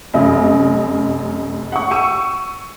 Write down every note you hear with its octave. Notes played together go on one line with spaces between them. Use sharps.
F1 F#2 D#5
F#5 C#6
C#6 E6 C#7 D#7